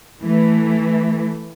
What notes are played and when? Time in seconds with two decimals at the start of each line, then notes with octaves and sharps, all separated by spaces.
0.23 E3 A3